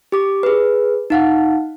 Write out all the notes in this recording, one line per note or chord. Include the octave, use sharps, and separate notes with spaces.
G4 D6
G#4 B4
D#4 F5 F#5